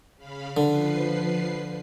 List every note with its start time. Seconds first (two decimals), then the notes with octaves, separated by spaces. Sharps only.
0.17 C#3 F5 B5
0.57 D3 F3 B4 C7